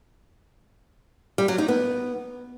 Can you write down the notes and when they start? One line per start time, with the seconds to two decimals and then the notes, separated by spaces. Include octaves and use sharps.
1.38 G3
1.48 F#3
1.58 D#4
1.68 B3